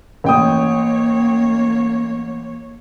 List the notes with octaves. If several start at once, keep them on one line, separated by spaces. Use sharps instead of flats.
A1 A#3 C#5 G5 D#6